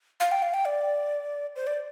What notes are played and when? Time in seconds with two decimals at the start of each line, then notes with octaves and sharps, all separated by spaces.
0.20 F5
0.31 G5
0.42 F5
0.54 G5
0.65 D5
1.56 C5
1.67 D5